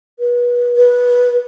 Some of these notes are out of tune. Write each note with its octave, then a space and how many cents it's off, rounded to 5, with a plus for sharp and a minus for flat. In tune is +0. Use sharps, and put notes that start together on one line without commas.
B4 -30
B4 -15